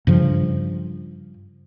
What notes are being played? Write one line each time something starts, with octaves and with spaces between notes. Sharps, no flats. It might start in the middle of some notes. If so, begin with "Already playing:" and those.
G2 C#3 F3